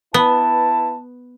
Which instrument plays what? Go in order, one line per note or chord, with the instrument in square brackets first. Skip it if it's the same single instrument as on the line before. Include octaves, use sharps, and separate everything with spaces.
[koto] B3 [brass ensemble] E4 B4 A5